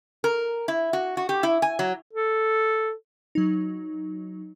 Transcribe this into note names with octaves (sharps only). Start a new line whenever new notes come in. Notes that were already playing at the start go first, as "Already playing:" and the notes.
A#4
E4
F#4
F#4
G4
E4
G#5
F#3
A4
F#3 D#4